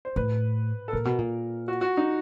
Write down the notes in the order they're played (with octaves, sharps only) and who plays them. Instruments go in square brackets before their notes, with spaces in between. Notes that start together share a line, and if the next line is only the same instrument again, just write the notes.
[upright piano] C5
[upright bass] A2 [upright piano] B4
[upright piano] A4
[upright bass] A#2 [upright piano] A#4
[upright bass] B2
A#2
[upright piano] F#4
F#4
D#4